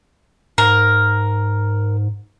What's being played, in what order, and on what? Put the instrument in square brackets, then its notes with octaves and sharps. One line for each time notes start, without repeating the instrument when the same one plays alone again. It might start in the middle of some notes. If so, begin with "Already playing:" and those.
[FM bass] G#2 [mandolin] A#4